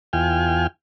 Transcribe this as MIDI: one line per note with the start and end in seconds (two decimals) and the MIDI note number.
0.13 0.67 40
0.13 0.67 65
0.13 0.67 79
0.13 0.67 80
0.13 0.67 89